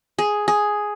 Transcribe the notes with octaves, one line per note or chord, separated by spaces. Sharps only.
G#4
G#4